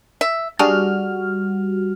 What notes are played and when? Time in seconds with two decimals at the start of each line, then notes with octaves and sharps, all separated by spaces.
0.21 E5
0.59 G3 D4 F#4 G#4 F6